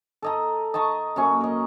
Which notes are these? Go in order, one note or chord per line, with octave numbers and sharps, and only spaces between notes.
A4 D#5 A#5
D#5 A5 A#5 C#6
F#2 A#3 C#4 C#6
A#4 D#5